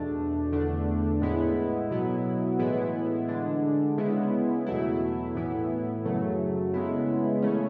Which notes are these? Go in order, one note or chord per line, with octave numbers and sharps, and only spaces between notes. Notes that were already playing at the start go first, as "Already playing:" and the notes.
Already playing: E2 B2 A3 D4
E2 D3 A3 D4
A2 G#3 B3 E4
B2 F#3 B3 E4
A2 E3 G#3 B3 E4
D3 G#3 D4
C#3 G#3 B3 E4
E2 B2 F#3 A3 E4
A2 E3 B3 E4
F#2 C#3 F#3 A3
C#3 G#3 B3 E4
C#3 E3 A3 C#4